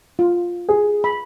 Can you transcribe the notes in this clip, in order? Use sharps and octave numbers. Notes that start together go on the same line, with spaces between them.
F4
G#4
B5